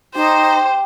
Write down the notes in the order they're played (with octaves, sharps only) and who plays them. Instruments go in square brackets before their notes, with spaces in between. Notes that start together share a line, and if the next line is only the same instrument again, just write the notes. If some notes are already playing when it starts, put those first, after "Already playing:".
[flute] D#4 [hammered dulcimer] G4 [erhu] C5